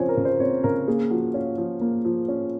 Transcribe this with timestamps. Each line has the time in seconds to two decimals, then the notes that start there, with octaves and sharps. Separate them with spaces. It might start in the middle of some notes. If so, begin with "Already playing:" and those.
Already playing: C#3 F3 C4 C5 C#5 G#5
0.09 A#4
0.17 C#3
0.25 C5
0.40 C4 C#5
0.64 C#3 A#4
0.88 A#3 G#4
1.11 F3 F#4
1.34 C#4 F4
1.57 F3
1.81 A#3
2.05 F3
2.28 C#4